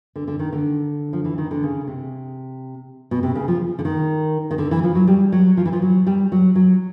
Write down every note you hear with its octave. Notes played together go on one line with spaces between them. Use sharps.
D3
D3
D#3
D3
F3
E3
D#3
D3
C#3
C3
B2
C3
C#3
F3
D3
D#3
D#3
D3
E3
F3
F#3
G3
F#3
F3
E3
F3
F#3
G3
F#3
F#3